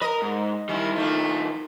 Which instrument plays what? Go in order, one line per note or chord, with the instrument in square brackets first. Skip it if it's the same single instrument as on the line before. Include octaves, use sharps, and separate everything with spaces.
[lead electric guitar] A#4 B4 [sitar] D#5
[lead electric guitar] G#2
[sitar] D#3 C#4 [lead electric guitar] G3 E4
[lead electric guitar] D#3 F3 [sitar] A3 A#3